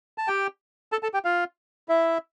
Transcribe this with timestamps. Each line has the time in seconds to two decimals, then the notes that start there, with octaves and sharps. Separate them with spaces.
0.18 A5
0.28 G4 G5
0.92 A4 A5
1.03 A4 A5
1.14 G4 G5
1.25 F4 F5
1.89 E4 E5